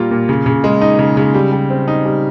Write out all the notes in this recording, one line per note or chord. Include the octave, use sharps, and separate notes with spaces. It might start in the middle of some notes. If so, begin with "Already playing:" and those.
Already playing: A#2 G3 A#3 F4
A#2
C#3
C#3
G#3
D#4
C#3
C#3
G3
G3
C4
D#4
G3